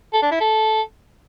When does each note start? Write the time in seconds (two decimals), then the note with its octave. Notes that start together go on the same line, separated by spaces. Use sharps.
0.13 A4
0.22 D4
0.31 E4
0.40 A4